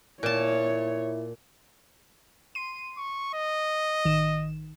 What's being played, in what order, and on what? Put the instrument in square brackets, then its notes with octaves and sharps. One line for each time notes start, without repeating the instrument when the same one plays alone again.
[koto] A#2 A5 [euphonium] E4 [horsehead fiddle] C#5
[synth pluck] C6 D#7
[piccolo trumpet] C#6
D#5
[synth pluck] A1 D#3 E7